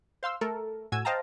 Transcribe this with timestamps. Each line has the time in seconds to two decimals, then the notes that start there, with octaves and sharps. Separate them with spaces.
0.23 C5 F5 C6 E6
0.41 A3 A4 A#4
0.92 A2 F#4 G#5 E6 G#6
1.05 C5 D#5 F5 G5 A5 A#5